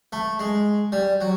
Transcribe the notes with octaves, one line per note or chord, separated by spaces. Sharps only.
A3
G#3
G3
F#3